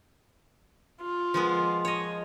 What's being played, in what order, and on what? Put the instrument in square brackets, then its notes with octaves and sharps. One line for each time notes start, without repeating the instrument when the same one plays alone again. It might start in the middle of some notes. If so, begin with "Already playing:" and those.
[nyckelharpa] F4
[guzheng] F3 G#3 B3
C#5 D#5